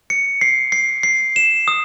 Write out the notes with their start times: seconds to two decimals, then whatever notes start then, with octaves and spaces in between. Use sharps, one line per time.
0.10 C#7
0.41 C7
0.72 C7
1.03 C7
1.36 E7
1.68 D#6